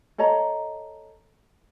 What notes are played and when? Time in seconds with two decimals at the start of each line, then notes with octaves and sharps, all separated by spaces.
0.18 A4 C#5 D#5 A#5